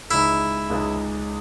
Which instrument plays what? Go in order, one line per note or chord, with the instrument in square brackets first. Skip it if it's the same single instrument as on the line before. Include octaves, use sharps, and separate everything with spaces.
[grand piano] C#2 C#3 G#3 D#4 G#4 [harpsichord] E4
[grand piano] C#2 C#3 G#3 D#4 G#4